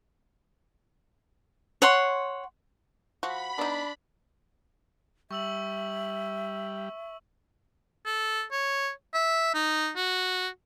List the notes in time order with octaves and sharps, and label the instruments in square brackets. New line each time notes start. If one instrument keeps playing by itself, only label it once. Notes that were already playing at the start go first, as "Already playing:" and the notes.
[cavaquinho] C#5 F#5 C6
[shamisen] F3 [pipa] F#4 [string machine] B5
[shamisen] B3 D#4 [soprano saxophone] D4
[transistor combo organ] G3 [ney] E5 [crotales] C#6 E6 F#7
[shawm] A4
C#5
E5
D#4
F#4